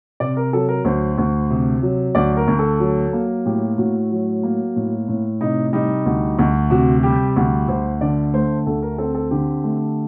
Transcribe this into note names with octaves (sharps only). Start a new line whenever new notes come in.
C3 D5
A#4
F#3 A4
A#4
D2 C5
D2
C3
F#3
D2 D5
A#4
D2
A4
F#3
A#3
A2 G4
A2 F#4
F#3
A#3
A2
A2
C3 D#4
G3 D#4
D2
D2
C3 F#4
G3 G4
D2
D2 C5
D3 D5
A3 C5
D2 A4
A#4
C4 A4
A4
D3 G4
A3